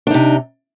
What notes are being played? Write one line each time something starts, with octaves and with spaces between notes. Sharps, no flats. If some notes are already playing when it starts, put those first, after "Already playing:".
C3 D4 D#4